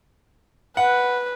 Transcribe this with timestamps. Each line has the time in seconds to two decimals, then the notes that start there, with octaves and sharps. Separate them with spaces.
0.77 B4 F#5